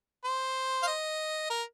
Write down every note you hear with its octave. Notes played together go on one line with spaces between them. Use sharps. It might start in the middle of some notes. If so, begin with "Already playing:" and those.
C5
F5
D#5
A#4